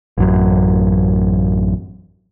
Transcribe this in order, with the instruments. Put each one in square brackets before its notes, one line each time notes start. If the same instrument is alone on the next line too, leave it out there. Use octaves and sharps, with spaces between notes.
[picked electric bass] A1 F#2